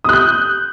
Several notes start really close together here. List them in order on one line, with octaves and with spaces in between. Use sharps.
D#6 F#6 G6